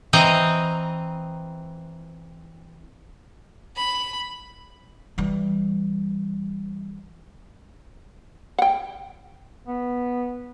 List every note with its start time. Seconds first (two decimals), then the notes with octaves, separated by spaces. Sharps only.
0.13 E3 C4 D#5 A#5
3.76 B5
5.18 E3 G3
8.59 F#5 G5
9.67 B3